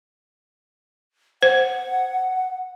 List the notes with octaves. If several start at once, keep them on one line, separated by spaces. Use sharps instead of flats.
C5 F#5